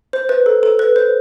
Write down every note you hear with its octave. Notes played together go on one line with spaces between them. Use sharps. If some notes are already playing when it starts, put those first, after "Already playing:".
C5
B4
A4
A4
B4
C5